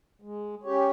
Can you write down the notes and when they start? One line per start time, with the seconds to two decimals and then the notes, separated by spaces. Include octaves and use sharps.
0.22 G#3
0.64 C#4 G4 C#5